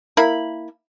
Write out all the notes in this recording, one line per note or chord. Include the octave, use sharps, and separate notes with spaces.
A#3 E4 B5